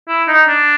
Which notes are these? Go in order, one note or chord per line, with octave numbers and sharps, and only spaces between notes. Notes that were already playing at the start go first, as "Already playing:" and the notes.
E4
D#4
D4